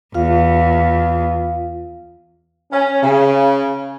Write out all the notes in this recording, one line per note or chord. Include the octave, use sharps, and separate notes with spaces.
E2 F4 F5
C#4
C#3